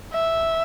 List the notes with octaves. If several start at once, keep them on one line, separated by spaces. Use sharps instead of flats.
E5